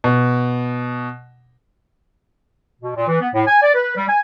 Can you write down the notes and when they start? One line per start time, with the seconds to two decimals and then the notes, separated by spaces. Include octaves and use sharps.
0.04 B2
2.82 B2
2.95 A#2
3.07 E3
3.19 B3
3.33 A2
3.46 G#5
3.60 D5
3.73 B4
3.95 G3
4.08 G#5